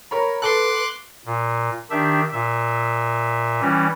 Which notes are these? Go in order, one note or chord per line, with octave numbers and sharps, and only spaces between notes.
A#4 C#5 B5
A4 B4 C6 D6 F#6
A#2
D#3 D4 G4 E5
A#2 E5
E3 G3 C#4